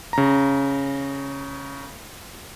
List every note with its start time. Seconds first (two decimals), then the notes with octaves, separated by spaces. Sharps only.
0.13 C#3 A#5